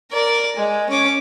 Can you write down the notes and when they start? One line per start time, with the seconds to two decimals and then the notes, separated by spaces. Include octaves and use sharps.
0.12 A#4 D5
0.57 G#3
0.89 C#4 D6